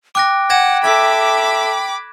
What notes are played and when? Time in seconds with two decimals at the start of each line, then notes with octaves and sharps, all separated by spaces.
0.15 G5 D6 F#6 A#6
0.50 F#5 G#6 A#6 E7
0.84 A4 E5 B5 D6 G#6